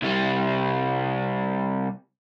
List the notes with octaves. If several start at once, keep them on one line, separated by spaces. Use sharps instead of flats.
C2 G3